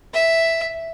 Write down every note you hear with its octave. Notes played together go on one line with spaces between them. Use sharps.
E5